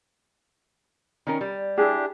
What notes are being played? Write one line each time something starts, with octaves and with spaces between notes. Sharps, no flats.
D#3 C#4 A#4
G3
D4 E4 G4 G#4